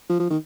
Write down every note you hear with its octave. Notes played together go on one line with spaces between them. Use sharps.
F3
F3
D#3